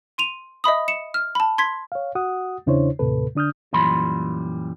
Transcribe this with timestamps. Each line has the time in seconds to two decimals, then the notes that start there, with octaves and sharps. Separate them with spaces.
0.18 C6 D#7 F7
0.64 D#5 E5 B5 D#6
0.88 C#7 E7
1.14 F6
1.35 A5 B5
1.58 C6 G#6 B6
1.92 C#5 F5
2.15 F#4 F#5 D#6
2.67 E2 C#3 D4 E4 C5 C#5
2.99 D#2 A2 C3 A4 B4
3.35 D3 D4 D#6 F6 G6
3.73 F#2 A#2 E3 G3 B5 C6